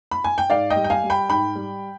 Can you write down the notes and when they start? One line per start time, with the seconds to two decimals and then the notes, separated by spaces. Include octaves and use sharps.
0.11 B5
0.24 G#5
0.38 G5
0.50 G#2 D5 F5
0.70 D#5 G5
0.76 G3
0.84 G5
0.90 F5 G#5
1.04 G3
1.10 G5 B5
1.29 G#2 G5 B5
1.56 G3